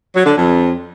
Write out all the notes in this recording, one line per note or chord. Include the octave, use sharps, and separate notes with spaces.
F#3
D3
F2